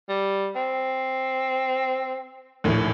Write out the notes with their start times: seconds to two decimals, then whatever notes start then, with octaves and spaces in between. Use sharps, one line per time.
0.09 G3
0.55 C4
2.64 A#1 D#2 A2